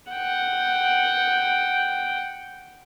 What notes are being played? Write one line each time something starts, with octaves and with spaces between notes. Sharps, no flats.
F#5 G5